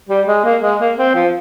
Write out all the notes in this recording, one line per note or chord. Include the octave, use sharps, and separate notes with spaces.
G3
G#3
A#3
G#3
A#3
C4
F3